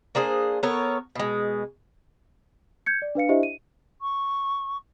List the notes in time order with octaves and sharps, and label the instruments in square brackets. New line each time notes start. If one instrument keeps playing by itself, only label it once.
[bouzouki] A#3 D4 G#4 C5
B3 A4 A#4 C#5
B2 G#3
[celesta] G6 G#6 C#7
D5
D4 B4 F5 C#7
D4 E4 G4 C5 D#5 E5
D#7
[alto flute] C#6